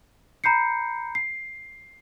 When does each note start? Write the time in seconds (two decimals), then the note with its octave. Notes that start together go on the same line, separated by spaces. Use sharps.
0.44 A#5 B5 G6 C7 C#7
1.15 C7